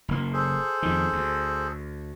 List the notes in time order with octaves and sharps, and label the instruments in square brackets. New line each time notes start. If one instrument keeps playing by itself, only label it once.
[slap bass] F#1 A#3
[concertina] G#4 A4 C5
[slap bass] F2 D#3
D2